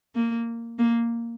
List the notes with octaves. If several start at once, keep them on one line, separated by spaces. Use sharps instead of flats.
A#3
A#3